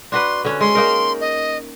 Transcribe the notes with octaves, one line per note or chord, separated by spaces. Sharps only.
D4 F#4 B4 C6
D3 C#4
G#3 C6
A#3 D#4 A#4
D#5